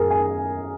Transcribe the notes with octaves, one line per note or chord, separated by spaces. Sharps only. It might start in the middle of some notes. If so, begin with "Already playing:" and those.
Already playing: F#2 G#4 A#4
G#5